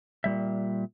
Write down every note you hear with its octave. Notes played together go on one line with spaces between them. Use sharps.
A#2 G3 E5